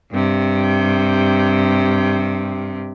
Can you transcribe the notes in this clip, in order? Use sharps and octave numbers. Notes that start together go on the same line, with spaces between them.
G2 C3